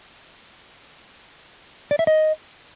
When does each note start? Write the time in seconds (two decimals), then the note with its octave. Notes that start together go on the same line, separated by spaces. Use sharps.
1.91 D5
1.99 E5
2.07 D#5